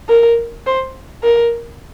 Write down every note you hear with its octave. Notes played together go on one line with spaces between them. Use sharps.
A#4
C5
A#4